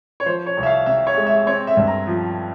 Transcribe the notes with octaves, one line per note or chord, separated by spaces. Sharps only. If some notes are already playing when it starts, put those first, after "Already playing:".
C#5
F3 C5
C#5
C2
E5
F5
C3 E5
C#5
G#3
E5
C4 C#5
E5
G2
A#5
F3